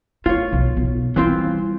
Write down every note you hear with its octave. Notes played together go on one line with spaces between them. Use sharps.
A3 F4 C#5
B1
B1
E3 G3 C4 F4